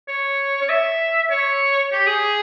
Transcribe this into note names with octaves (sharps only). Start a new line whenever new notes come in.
C#5
C#5
E5
C#5
G4
G#4